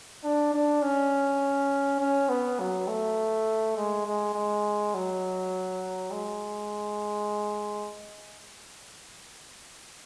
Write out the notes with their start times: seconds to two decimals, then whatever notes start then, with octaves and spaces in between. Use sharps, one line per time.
0.24 D4
0.54 D4
0.82 C#4
2.00 C#4
2.29 B3
2.59 F#3
2.88 A3
3.77 G#3
4.06 G#3
4.35 G#3
4.94 F#3
6.11 G#3